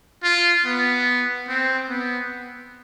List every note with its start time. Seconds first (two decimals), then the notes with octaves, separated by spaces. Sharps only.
0.23 F4
0.65 B3
1.48 C4
1.89 B3